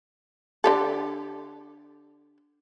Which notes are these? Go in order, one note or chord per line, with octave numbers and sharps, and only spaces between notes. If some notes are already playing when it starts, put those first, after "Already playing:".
D3 G4 A4